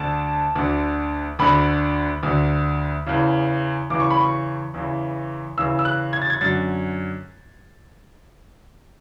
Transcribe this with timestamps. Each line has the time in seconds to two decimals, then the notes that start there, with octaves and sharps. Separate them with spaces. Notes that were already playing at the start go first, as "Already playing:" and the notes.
Already playing: D2 D3 A5
0.55 D2 D3
1.39 D2 D3 B5
2.23 D2 D3
3.06 E2 C#3 E3
3.90 E2 C#3 E3 D6
4.00 C#6
4.10 B5
4.21 C#6
4.74 E2 C#3 E3
5.57 E2 C#3 E3 E6
5.79 E6
5.85 F#6
6.13 G#6
6.22 A6
6.30 G#6
6.41 F#2 D3 A6